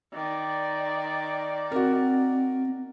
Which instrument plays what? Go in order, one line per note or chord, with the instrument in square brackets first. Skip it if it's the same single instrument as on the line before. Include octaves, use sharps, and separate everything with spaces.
[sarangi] D#3 [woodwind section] D5
[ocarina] C4 [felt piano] F#4 A#4